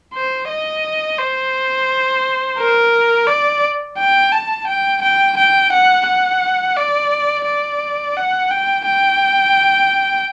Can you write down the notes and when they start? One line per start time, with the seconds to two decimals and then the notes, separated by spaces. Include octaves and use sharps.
0.14 C5
0.49 D#5
1.18 C5
2.58 A#4
3.27 D5
3.97 G5
4.32 A5
4.68 G5
5.02 G5
5.37 G5
5.72 F#5
6.06 F#5
6.76 D5
7.46 D5
8.16 F#5
8.51 G5
8.85 G5